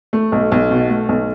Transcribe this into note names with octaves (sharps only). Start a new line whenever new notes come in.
A3
B1
B1
B2
A3
B1